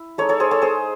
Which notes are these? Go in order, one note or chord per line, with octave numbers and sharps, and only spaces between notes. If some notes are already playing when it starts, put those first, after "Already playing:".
Already playing: E4
G#3 D#4 A4 C#5
A4 C#5
G#4 C5
A4 C#5
G#4 C5